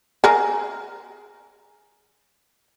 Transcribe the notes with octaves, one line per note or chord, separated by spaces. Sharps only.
G#4 A#4